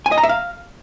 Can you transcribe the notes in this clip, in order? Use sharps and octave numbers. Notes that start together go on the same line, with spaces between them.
G#5
D#5
A#5
E5
F5